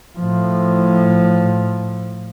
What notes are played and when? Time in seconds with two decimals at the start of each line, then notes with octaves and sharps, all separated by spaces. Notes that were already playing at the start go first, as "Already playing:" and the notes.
0.19 A2 F3